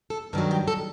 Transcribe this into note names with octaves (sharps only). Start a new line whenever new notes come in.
A4
G2 D#3 F#3 A4
G4
A4